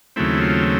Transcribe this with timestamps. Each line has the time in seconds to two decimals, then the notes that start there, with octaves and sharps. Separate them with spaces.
0.16 D#2 C#3 F#3 A3 C4 E4
0.41 F4